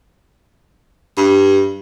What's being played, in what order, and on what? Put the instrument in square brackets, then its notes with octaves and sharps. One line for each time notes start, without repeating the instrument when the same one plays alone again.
[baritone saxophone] G2